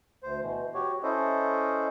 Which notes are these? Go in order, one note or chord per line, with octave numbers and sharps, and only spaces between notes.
D2 C5
B2 E3
F#4 G4 C#5
C#4 E4 A4 C5 D#5